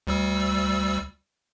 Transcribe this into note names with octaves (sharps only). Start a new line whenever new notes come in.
D2 G3 E6